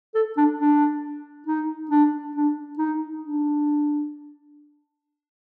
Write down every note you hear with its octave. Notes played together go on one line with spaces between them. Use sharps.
A4
D4
D4
D#4
D4
D4
D#4
D4